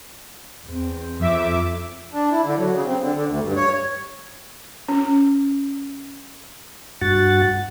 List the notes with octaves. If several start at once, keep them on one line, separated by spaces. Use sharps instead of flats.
E2 C4
F2 E5 D6
D4
E4
D3
F#3
C#3
C4
D3
D3
D2
G2
C#5
C#4
G2 F#4 F#5 A6